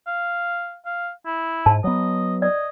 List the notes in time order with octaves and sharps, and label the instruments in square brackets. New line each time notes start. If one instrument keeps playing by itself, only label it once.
[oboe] F5
F5
E4
[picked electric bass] G#2 [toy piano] A5
[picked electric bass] F#3 B3 [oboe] D#5
[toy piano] D5 [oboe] D#5